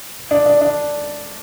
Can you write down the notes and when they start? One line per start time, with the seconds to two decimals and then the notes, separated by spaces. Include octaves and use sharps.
0.31 D4
0.46 D4
0.61 D4